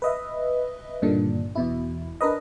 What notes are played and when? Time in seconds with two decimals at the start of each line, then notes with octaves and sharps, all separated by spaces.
0.02 B4 D#5 E5
1.02 G2 A#2 D3 D#3 D4
1.55 E2 B2 E4
2.21 D4 A#4 B4 D#5